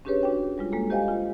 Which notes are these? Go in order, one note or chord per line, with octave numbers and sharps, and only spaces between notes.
C#4 D4 G4 G#4 B4 C#5
D4 F#4 G5
G3 G#3 F4
G#3 A#3 A4
G4 C5 D#5 F5 G5 G#5
F4